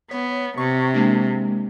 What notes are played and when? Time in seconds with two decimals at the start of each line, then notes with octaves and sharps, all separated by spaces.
0.11 B3 C#5
0.57 C3 C#6
0.94 G#3 A#3 D4